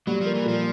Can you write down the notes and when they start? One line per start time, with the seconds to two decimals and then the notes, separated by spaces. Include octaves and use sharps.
0.07 F#3 G3
0.21 F3 A#3
0.35 E3
0.45 A#2 F3